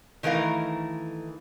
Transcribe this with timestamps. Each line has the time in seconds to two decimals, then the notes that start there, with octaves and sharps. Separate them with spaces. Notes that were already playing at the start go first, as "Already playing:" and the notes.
0.23 D#3 E3 A3 A#4 F5